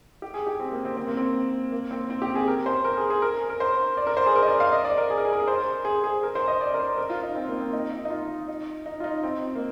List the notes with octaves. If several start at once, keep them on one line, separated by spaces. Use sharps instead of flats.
G4
G#4
G4
C4
A#3
C4
C4
A#3
C4
A#3
C4
C4
G4
G#4
A#4
C5
A#4
G#4
G#4
A#4
A#4
C5
D5
A#4
C5
G#4
A#4
D#5
D5
F5
D#5
D5
A#4
G#4
A#4
G#4
A#4
G#4
C5
G#4
G#4
A#4
C5
D#5
D5
A#4
C5
A#4
F4
D#4
C4
A#3
C4
D#4
D#4
D#4
F4
D#4
D#4
F4
D#4
C4
A#3